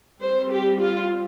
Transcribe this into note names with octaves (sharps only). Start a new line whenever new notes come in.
G3 C4 C5
G4
F4